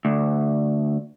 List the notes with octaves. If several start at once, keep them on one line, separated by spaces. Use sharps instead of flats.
D2